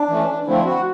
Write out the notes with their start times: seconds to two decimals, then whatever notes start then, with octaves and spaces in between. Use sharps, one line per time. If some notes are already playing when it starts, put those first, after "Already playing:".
Already playing: D4
0.09 E3 A3 C#4
0.47 D3 F3 A3 C4 E4
0.65 F#4